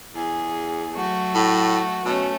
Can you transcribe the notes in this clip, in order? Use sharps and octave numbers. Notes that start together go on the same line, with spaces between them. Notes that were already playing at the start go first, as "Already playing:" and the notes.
E2 G#4
F#3 A3 F#4
A2
B2 A3 C#4